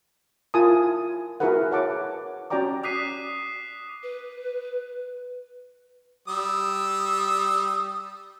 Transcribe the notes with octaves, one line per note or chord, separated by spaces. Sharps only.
E4 F4 A#4 G#5 A5 D#6
E4 F#4 G#4 A#4 B4 F#5
C#5 F#5 A5 D6
C#4 F#4 D5 G5 A#5 D6
D6 D#6 F#6 B6 C7 D#7
B4
G3 D#6 E6